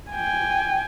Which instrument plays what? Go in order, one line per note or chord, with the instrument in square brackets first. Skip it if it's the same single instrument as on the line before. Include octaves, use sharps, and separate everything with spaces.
[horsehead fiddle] G5 G#5